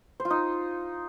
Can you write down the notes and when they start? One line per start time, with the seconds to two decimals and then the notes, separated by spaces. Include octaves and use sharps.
0.20 C5
0.25 F4
0.30 D#4